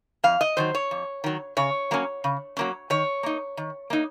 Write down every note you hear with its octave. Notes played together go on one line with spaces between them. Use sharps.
F2 F5
D#5
D#3 F#3 C5
C#5
F2
D#3 F#3
C#3 C#5
F#3 A#3 C#4
C#3
F#3 A#3 C#4
D#3 C#5
A#3 D#4
D#3
A#3 D#4